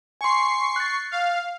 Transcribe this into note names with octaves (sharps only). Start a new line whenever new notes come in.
G#5 C6 C#6 C7
F#6 A6
F5